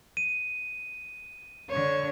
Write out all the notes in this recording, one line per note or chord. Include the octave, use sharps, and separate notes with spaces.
D#7
D3 C#5